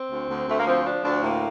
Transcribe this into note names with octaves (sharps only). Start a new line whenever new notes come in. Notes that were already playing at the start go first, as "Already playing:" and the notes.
Already playing: C4
D2
D2
D2 A3
A#3
F3 C4
F3 D4
D2 D4
A2 A#3